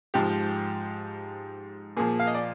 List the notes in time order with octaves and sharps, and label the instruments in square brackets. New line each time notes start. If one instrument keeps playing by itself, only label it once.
[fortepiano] G#2 F3 G4
A#2 F3 G#4
F5
D#5
D5